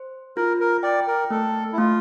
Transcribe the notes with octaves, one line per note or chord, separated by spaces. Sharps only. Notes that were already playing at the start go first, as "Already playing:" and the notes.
Already playing: C5
F4 A#4
A#4
D5 G5
A#4
A3 A4
E4
A3 F4